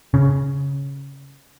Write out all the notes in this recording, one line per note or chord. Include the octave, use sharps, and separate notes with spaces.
C#3